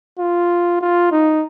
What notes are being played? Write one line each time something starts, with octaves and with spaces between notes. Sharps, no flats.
F4
F4
D#4